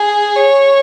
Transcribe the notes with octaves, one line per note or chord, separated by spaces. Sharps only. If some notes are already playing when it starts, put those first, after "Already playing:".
Already playing: G#4
C#5